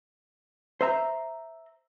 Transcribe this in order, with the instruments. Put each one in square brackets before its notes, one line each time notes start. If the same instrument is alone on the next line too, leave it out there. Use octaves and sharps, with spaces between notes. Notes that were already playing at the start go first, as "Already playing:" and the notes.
[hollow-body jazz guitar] C5 E5 A#5